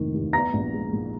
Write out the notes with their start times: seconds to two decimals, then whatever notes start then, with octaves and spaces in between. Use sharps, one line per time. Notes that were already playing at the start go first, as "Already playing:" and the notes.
Already playing: F1 D#3 F3 A#3
0.14 D#2
0.33 B3 A#5 A#6
0.53 A#1
0.73 G#3
0.93 A#2